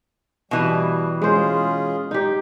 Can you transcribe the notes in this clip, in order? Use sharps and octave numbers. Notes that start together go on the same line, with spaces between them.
B2 E3 G3
G#3 C#4 F4 G#4 C5
D#4 G4